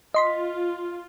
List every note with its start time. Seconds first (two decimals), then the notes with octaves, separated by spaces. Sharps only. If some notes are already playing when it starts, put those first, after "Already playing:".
0.14 F4 D#5 C6 B6